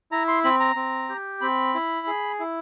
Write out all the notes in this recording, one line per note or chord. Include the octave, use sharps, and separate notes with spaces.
E4 A#5
C6
C4 B5
A#5
C4
G4
C4 B5
E4
G#4
E4